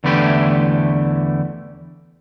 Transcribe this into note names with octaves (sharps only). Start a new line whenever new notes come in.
E2 D3 E3 A3 E4 G4